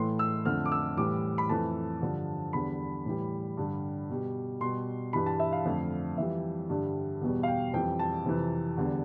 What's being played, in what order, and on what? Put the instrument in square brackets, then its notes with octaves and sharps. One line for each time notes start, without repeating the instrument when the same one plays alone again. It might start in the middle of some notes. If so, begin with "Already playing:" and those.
Already playing: [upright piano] A2 E3 A3 C6
E6
F2 D3 A3 F6
D6
E6
A2 E3 G3 D6
B5
F2 E3 A3 A5
G2 D3 F3
E2 D3 G3 B5
A2 E3 G3
G2 D3 G3
B2 G3
B2 G3 C6
G2 E3 G3 B5
A5
E5
F5
F2 D3 F3 A3
F2 E3 G3 E5
G2 D3 G3
E2 B2 G3
F5
G5
F2 E3 G3 G5
A5
F2 C3 E3
E2 D3 G3